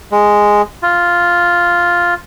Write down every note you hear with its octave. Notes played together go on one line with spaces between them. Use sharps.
G#3
F4